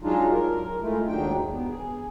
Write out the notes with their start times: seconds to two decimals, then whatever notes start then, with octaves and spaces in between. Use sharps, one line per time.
0.03 F#3 G#3 D4 D#4 F4
0.32 A#4
0.82 G#3 A3 E4 F4
1.07 D#2 G#2 F#3 D4 D#4 G5
1.50 B3
1.67 G#4